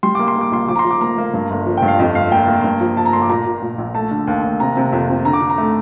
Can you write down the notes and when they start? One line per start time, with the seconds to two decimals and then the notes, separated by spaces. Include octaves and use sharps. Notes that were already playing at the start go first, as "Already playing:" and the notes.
0.03 G3 C6
0.15 A#3 D6
0.28 C6
0.36 A#3
0.41 D6
0.52 A#1 C6
0.68 F3 D6
0.76 A#5
0.79 C6
0.85 F3
0.91 D6
1.01 A#3 A#5
1.18 A#3
1.34 G2
1.51 G1
1.66 F3
1.77 G2 G5
1.88 F5
1.98 F2 D#5
2.15 G1 F5
2.31 A#3 G5
2.48 A#3
2.64 G2
2.81 F3
2.97 F3 A5
3.05 A#5
3.13 G1 C6
3.22 D6
3.29 A#2 A#5
3.46 A#2
3.62 A#2
3.78 A#1
3.94 A3 A5
4.11 D3
4.27 D#2
4.44 D#2
4.60 C3 A#5
4.77 C3
4.92 F2
5.09 F2
5.25 D3 A#5
5.33 D6
5.41 D3
5.50 A#5
5.58 A3